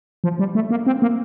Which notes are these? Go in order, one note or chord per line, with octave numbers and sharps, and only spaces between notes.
F3
G3
A3
A#3
C4
A#3